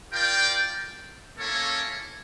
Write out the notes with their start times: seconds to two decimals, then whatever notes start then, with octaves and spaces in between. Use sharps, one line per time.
0.12 F4 A#4 D5 G5
1.37 A#3 C#4 E4 A4 C#5